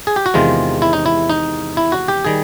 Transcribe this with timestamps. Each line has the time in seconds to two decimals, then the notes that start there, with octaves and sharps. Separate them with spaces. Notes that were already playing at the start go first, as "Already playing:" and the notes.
0.07 G#4
0.16 G4
0.26 F#4
0.34 E2 C3 D#3 G#3 F4
0.82 E4
0.93 D#4
1.06 E4
1.30 D#4
1.77 E4
1.92 F#4
2.08 G4
2.24 D#3 G3 G#4